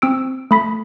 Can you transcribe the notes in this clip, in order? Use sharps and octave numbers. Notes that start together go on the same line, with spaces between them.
C4 E6 D7
A3 B5 B6